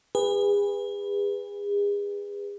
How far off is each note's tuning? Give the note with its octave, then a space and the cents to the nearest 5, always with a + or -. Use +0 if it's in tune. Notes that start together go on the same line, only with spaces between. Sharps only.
G#4 -35 B4 +0